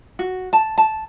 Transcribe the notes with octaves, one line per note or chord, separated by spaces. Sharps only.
F#4
A5
A5